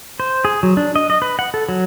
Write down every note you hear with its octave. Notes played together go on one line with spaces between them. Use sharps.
C5
G#4
F#3
D4
D#5
D#5
B4
F#5
A4
F#3